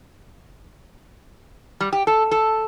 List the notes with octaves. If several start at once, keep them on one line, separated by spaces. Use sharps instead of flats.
G3
G4
A4
A4